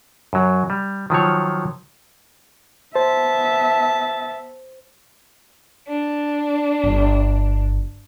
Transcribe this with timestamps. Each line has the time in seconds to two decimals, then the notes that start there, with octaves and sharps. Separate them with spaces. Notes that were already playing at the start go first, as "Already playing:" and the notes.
0.33 F#2 F#3
0.70 G3
1.10 D#3 F3 F#3 C#5
2.96 B3 C5 E5 A5
5.88 D4
6.84 G1